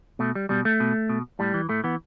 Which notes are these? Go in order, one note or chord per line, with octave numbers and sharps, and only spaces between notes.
B2 A3
G3
B2 G3
A3
B2
B2
A2 G3
E3
A2 A3
E3 B3